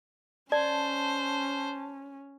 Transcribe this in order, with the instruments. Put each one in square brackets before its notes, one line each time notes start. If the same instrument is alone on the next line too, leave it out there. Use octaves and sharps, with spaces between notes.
[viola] C#4 [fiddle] C5 [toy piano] D5 [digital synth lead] A5